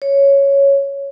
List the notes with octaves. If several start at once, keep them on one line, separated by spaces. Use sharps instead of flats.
C#5